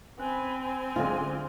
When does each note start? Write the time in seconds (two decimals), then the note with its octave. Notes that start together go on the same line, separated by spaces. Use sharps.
0.20 C4 G#5 B5 F#6
0.63 G#5
0.96 D2 D3 G#3 F4